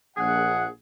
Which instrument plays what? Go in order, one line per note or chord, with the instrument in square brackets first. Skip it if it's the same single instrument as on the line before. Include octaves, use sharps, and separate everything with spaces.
[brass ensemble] A#1 F#5 [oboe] G#4